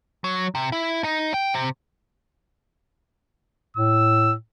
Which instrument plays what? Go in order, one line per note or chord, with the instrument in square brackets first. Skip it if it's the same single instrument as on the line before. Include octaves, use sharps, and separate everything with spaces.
[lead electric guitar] F#3
C3
E4
D#4
G5
C3
[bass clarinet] A2 [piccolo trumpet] E6